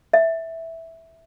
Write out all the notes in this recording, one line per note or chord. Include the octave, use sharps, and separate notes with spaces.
E5